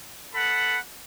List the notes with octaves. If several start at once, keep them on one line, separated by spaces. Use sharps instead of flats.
A4 F#5 B5